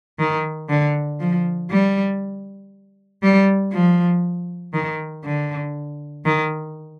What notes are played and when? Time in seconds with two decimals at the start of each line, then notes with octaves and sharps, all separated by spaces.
0.19 D#3
0.69 D3
1.20 F3
1.71 G3
3.23 G3
3.73 F3
4.74 D#3
5.24 D3
6.25 D#3